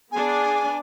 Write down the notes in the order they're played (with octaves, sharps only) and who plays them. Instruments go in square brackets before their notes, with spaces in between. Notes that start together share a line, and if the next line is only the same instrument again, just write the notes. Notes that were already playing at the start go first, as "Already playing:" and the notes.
[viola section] B3 D4 [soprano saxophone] G#4 [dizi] G#5